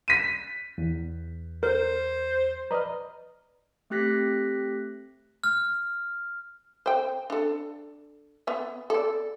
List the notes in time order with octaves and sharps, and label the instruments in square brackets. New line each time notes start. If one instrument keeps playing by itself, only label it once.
[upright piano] B6 D#7
[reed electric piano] E2
[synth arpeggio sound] A#4 [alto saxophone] C5
[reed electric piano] B4 D5 D#5 [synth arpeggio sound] A#5 F6
[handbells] A3 C4 G4 F#6 A#6 B6
[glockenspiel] F6
[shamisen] C5 G5
D4 A4
B3 E5
A4 D5